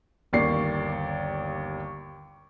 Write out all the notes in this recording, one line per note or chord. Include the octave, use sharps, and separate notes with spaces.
G1 D#2 A#3 D5 C#6 C7